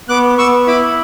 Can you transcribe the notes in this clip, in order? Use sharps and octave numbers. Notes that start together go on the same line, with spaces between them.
B3 D6 F#6
B3 C#6 E6
E4 B5 D6